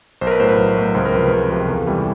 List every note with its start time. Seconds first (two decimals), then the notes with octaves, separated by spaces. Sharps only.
0.21 B1 C5
0.27 A#4
0.31 B4
0.40 A2 F#3 C5
0.49 B4
0.58 B1
0.76 A2 F#3
0.94 C#2 C5
1.06 A#4
1.13 C3 B4
1.17 F3
1.26 B4
1.31 C#2 A#4
1.50 C3 F3 A#4
1.68 E2 A4
1.87 C3 E3 G3